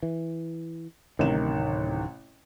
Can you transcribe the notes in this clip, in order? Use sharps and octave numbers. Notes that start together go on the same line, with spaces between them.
E3
D1 A1 C3 D#3 E7